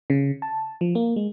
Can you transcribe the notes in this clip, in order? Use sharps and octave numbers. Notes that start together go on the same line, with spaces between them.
C#3
A5
F3
A#3
G#3